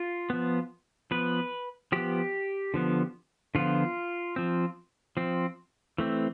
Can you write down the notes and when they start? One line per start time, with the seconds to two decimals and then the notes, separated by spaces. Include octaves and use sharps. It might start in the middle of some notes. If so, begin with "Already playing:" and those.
Already playing: F4
0.30 F3 B3
1.11 F3 B3 B4
1.92 F3 B3 G4
2.74 D3 F3 B3
3.55 D3 F3 B3 F4
4.36 F3 C4
5.17 F3 C4
5.98 E3 A3 C4